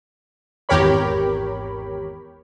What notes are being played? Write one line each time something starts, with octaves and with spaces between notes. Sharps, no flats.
G#1 E2 G4 A#4 C#5 B5